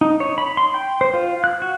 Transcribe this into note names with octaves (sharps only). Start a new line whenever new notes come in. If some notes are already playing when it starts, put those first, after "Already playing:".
D#4
C#5
B5
C6
G5
C5
F4
F#6
F#4